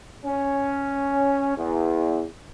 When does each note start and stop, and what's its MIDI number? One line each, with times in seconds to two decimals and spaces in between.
0.25 1.56 61
1.57 2.24 40